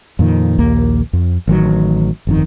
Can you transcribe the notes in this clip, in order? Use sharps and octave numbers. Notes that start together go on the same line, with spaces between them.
F2 A#2 D#3
A#1 D#2 A#3
F2
A1 D#3 F#3
G1 F2 D#3